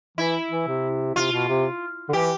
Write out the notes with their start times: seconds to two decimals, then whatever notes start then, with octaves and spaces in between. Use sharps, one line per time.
0.18 E3 E4
0.50 E3
0.67 C3
1.15 C3 F4
1.32 B2
1.49 C3
2.09 D3
2.13 E3 G4